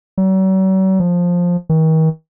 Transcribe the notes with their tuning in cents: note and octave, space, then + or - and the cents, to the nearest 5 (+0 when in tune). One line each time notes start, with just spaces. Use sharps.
F#3 +45
F3 +10
D#3 +40